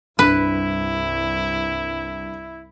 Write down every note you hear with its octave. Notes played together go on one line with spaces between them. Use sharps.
C2 G2 E4 B4